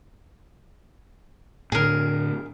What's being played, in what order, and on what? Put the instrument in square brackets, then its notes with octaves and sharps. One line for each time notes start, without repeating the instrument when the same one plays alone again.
[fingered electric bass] A2 D3 [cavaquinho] G#4 A#4